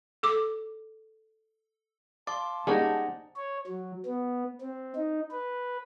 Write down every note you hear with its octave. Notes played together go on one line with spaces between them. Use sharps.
A4 D6
D5 F5 A5 C6 D6
G3 A#3 C#4 D#4 G#4 C5 D5 F#5
C#5
F#3
B3
C4
D#4
B4